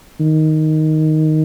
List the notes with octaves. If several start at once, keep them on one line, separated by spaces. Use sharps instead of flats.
D#3